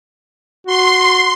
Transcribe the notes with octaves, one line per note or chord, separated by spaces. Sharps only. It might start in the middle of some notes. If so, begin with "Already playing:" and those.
F#4 C6